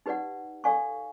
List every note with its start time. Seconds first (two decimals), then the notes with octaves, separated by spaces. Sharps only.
0.06 D#4 G4 B4 D5 F#5
0.64 A4 D5 F5 G#5 C#6